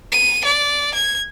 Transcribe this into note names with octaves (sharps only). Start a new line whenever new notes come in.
D#7
D5
G#6